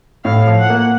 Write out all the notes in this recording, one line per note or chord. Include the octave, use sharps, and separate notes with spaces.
A2 F5
F3
F#5
A#3